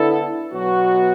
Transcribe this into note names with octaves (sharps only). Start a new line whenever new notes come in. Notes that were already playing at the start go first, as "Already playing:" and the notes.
Already playing: D3 B3 E4 A4
B2 F#3 B3 F#4